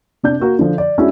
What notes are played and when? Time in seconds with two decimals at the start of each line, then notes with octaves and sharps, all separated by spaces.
0.23 C3 D4 G6
0.40 A#3 F#4 A#4
0.59 D3 F3
0.78 D5
0.98 G#3 C#4 D4 E4 F#4